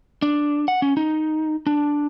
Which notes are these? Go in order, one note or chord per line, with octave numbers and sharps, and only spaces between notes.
D4
F#5
C#4
D#4
D4